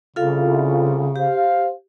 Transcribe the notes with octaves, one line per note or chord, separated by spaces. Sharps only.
C2 C#3 F4 A4 F5
G4 C5 F5